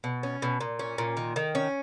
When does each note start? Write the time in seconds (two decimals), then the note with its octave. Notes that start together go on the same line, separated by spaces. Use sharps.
0.04 B2
0.23 C#4
0.42 B2
0.61 A#2
0.79 C#4
0.98 A#2
1.17 D#3
1.36 D#3
1.55 C#4